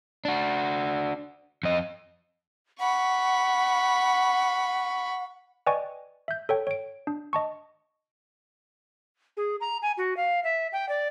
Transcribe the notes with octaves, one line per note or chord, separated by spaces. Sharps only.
D4 F#4
F2 D#5
F#5 B5 C#6
B4 D5 D#5 G5 G#5 C#6
E5 G6
A4 C#5 G5
C#5 D7
D4
D#5 A5 C#6
G#4
A#5
G#5
F#4
F5
E5
G5
D5